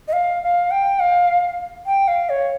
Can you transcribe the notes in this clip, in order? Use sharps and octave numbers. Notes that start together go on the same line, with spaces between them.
D#5
F5
F5
G5
F5
G5
F5
C#5